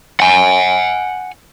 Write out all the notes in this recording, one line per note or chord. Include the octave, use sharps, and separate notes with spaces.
F#5 G#5